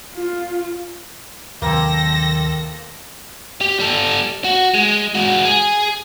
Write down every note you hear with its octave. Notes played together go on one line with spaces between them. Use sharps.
F4
D#2 C3 D#3 F#3 A#3 C4 A4 A#6
G4
G3 A4
F#4
G#3
G#3 F#4
G#4